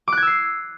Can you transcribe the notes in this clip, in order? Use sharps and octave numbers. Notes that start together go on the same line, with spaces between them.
D6 E6 F#6 G#6 C7